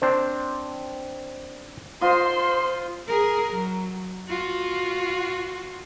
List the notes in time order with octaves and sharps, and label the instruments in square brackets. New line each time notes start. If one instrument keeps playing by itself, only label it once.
[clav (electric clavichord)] C4 D4 C5
[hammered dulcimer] F4 D#5 [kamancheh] C5 C6
[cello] G#4 A#4
F#3
F4 F#4